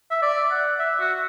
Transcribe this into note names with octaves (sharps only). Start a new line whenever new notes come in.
E5
D5
F#5
E5
F#4